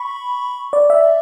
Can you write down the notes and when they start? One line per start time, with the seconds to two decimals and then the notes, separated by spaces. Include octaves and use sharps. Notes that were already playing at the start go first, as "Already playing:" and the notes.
Already playing: B5 C#6
0.73 D5
0.90 E5